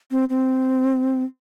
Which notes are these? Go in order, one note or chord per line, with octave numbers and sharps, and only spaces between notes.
C4
C4